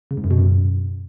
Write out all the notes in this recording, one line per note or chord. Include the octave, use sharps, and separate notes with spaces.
C#3
G#2
F#2
B2
F#2